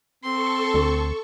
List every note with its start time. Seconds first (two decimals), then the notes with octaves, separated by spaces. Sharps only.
0.24 C4 A4 C6 C#6
0.74 D2